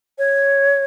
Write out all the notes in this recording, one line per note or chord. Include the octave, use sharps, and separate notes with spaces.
C#5